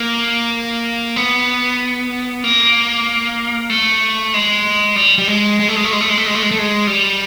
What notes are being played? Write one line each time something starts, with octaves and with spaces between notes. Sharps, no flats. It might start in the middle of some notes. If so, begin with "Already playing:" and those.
Already playing: A#3
B3
A#3
A3
G#3
G3
G3
G#3
G#3
A3
G#3
A3
G#3
A3
G#3
A3
G#3
A3
G#3
A3
G#3
G3